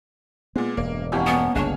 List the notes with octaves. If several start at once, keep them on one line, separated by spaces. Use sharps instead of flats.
A#2 G#3 B3
E1 G2 A#3
F2 B2 E3 A#3 C#4 G4
B3
G1 C#2 G2 D4 G#4 C#5